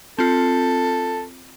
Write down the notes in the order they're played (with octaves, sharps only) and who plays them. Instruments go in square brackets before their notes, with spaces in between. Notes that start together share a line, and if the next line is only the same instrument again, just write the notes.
[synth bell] C4 F4 [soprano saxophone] A4